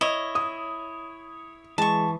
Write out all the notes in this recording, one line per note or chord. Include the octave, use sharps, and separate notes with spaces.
E4 C#5 D#5
D#6
E3 G#3 A5 C#6